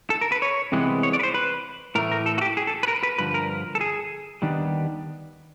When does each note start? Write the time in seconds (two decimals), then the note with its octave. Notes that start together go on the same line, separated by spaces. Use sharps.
0.10 A4
0.21 A#4
0.32 B4
0.42 C#5
0.72 C2 C3 E3 G#3 B3
1.03 C#5
1.13 D5
1.19 B4
1.23 C5
1.34 B4
1.95 A2 E3 A3 A#4
2.12 A#4
2.26 A4
2.38 F#4
2.41 G4
2.57 G#4
2.67 A4
2.83 B4
2.88 A#4
3.03 B4
3.18 G2 D3 F3 B4
3.34 A#4
3.75 A4
3.81 G#4
4.42 D#2 D#3 G3 B3 D4